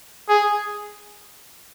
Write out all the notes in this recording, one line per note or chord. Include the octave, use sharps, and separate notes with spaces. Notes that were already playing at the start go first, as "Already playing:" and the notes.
G#4